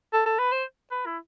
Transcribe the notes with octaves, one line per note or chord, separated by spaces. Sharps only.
A4
A4
B4
C5
B4
E4